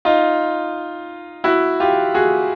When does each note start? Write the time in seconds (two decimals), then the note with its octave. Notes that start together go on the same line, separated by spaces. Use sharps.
0.05 D#4 F4
1.44 E4 F#4
1.80 F4 G4
2.14 F#4 G#4